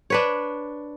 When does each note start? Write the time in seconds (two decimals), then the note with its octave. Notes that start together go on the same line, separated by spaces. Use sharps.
0.10 D4 B4 C#5